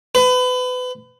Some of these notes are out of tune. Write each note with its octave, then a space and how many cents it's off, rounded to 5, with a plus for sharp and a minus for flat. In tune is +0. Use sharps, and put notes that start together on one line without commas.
B4 +30